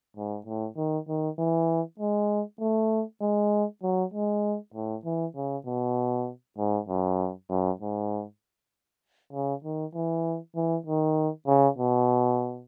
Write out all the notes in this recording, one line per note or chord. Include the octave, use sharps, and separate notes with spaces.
G#2
A2
D#3
D#3
E3
G#3
A3
G#3
F#3
G#3
A2
E3
C#3
B2
G#2
F#2
F#2
G#2
C#3
D#3
E3
E3
D#3
C#3
B2